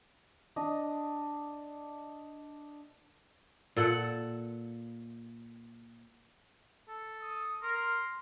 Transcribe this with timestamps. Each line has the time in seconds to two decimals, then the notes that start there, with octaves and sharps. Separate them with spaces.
0.56 D4 D#5 D#6
3.76 A#2 A4 F#5
6.89 A4
7.21 D#6
7.63 A#4 C6